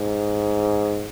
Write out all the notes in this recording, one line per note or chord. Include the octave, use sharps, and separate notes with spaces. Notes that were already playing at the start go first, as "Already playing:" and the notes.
Already playing: G#2